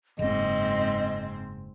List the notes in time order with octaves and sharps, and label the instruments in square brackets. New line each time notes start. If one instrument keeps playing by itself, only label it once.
[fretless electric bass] F#1 [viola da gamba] G#2 C4 [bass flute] D#5